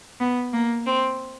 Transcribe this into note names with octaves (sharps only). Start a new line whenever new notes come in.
B3
A#3
C4